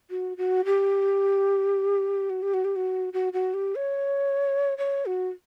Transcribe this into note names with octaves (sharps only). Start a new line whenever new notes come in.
F#4
F#4
G4
F#4
G4
F#4
G4
F#4
F#4
F#4
G4
C#5
C#5
F#4